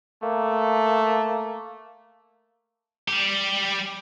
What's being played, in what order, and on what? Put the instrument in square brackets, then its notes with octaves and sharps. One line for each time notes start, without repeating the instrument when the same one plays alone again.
[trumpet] A3 [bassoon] A#3
[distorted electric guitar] G3 G4